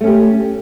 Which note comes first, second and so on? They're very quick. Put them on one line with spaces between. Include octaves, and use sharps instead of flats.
A3 C#4 G4